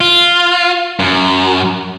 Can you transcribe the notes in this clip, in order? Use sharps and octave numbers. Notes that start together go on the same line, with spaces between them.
F4
F#2